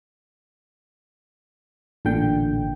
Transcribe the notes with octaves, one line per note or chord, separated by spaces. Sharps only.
A1 A#2 D3 G5